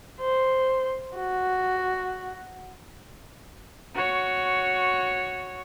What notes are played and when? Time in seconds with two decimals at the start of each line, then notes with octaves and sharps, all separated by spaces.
0.21 C5
1.15 F#4
3.95 F#4 C#5